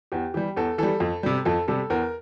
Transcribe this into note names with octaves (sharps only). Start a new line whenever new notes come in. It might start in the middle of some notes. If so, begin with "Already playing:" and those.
E2 G4
E3 G3 G4
E2 A4
E3 G3 A4
F2
C3 G3
F2 A4
C3 G3 A4
E2 A#4